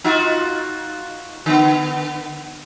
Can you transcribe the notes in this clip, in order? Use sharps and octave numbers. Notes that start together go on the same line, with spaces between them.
D#4 F4 F#4
D3 B3